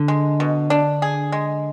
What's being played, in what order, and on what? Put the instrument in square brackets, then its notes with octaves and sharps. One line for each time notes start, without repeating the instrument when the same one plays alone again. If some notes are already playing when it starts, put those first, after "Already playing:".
Already playing: [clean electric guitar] D3
[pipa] G#3
B2
D4
G#4
G#3